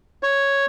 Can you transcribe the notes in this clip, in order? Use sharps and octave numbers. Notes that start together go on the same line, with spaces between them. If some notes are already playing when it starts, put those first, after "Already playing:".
C#5